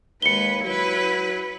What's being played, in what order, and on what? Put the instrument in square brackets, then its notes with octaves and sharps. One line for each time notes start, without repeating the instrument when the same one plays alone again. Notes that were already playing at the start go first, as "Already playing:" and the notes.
[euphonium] D#2 [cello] G#3 B4 [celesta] C#7 G7
[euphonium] F#3 [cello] E4 B4